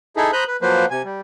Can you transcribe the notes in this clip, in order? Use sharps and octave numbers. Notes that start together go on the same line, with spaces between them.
D#4 E4 G#4 A4
C5 A#5 B5 D#6 F#6 G6
B4
F3 F#3 A#3 B4 C5
C3 G#5
G3